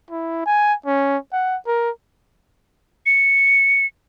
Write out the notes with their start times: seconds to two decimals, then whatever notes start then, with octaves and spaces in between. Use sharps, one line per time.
0.10 E4
0.46 G#5
0.86 C#4
1.33 F#5
1.67 A#4
3.06 C#7